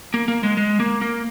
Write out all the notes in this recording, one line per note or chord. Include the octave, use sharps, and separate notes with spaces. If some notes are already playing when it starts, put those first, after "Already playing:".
A#3
A#3
G#3
G#3
A#3
A#3